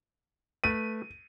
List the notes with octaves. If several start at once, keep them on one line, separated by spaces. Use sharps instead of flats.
A3 B4 D#7